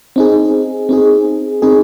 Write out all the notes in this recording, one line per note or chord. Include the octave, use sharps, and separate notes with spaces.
C4 D#4 G#4
C4 D#4 G#4
C4 D#4 G#4